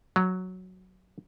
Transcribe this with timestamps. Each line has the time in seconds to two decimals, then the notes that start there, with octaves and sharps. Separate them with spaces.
0.16 F#3